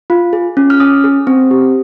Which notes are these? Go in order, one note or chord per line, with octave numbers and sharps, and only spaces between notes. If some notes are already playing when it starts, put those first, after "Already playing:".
F4
G#4
C#4
F6
C#4 D#6
G#4
C4
G4